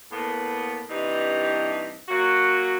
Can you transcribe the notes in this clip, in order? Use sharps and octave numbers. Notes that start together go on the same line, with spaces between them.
A2 A#3 B3
G2 C3 E3 G3 D#4
F#3 A#3 F#4